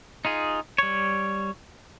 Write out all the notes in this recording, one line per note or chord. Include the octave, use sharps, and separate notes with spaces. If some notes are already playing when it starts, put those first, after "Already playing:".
D#4 F4 G#4
G3 C#5